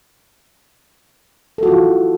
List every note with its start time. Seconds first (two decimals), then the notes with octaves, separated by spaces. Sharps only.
1.58 A4
1.63 F#4
1.67 F4
1.72 E3